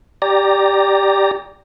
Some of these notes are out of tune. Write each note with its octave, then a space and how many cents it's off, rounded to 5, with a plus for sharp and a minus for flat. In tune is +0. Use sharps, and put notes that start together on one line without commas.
G4 +5 D5 +0 A#5 +0